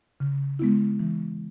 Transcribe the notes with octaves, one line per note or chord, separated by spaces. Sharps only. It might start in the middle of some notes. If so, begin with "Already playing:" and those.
C#3
G#3 B3 E4
E3